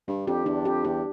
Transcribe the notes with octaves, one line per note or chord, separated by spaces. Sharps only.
G2 D4
F2 G4
E2 D4
F2 G4
E2 G4